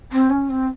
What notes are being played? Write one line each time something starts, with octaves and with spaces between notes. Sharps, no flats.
C4
C#4
C4